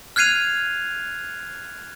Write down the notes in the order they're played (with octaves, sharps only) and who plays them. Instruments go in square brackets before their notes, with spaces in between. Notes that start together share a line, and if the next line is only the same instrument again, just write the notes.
[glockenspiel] F6 F#6 G#6 C7 D#7 F7